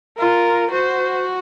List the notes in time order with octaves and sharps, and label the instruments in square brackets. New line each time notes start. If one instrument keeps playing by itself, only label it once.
[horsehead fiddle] F4 [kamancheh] A#4
[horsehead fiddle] F#4 [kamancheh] C5